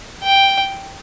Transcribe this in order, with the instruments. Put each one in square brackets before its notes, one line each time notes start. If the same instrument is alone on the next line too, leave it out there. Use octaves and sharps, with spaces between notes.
[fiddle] G5